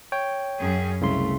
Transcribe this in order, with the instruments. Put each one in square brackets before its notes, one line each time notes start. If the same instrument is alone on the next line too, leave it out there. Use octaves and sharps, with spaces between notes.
[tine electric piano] C#5 G5
[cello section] F#2 C#4 G#4
[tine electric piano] C2 C#3 C6 [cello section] A3